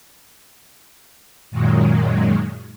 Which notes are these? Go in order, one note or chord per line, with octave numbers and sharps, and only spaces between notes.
F#2 A#2 D#3 F#3 G#3